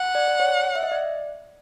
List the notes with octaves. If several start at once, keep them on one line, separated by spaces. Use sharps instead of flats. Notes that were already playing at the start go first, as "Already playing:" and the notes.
Already playing: F#5
D5
D5
C#5
E5
D#5
D5